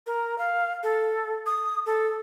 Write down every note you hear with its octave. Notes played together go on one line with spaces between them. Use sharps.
A#4
F5
A4
D#6
A4